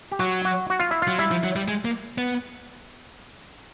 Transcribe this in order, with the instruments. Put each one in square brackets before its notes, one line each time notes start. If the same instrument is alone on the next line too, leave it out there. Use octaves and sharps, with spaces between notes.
[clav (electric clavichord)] G4
[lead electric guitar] F#3 [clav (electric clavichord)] F#4
[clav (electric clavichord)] F#4
F#4
F4
E4
F4
[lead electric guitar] F#3
[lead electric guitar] G3 [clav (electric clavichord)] E4
[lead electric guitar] F3
F#3
G3
G#3
A#3
B3